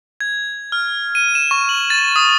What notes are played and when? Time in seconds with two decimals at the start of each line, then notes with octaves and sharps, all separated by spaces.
0.21 G#6
0.72 F6
1.15 D#7
1.35 E7
1.51 C#6
1.69 F#7
1.90 A6
2.16 D#6